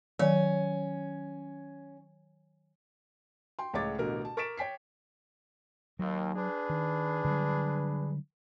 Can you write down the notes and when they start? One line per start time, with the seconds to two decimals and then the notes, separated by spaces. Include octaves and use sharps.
0.19 D#3 F#3 C#4 D5
3.59 G5 C6
3.74 C#2 A2 G#3 C#5 D6 A6
3.98 A1 B2 D3 A#4
4.25 A5
4.37 A#4 C#6 A6 B6 D7 E7
4.58 C#5 G5 B6 C7
5.99 D#2 F#3
6.36 D4 G#4 B4
6.70 D#3
7.24 D3 F#3 G3